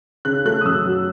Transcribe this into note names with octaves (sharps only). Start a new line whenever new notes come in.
C#3 F#6
A3 F#6
D#6
F#2 E6
F#3